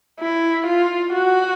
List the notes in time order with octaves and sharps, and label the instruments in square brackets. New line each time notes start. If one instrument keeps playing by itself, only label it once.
[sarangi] E4
F4
F#4